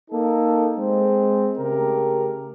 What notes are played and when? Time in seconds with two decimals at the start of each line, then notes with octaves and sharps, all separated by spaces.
0.11 A#3 D#4 A4
0.76 G#3 C4
1.58 C#3 A3 G4 A#4